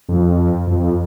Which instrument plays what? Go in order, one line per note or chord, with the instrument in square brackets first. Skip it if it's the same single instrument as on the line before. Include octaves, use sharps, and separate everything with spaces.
[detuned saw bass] F2
F2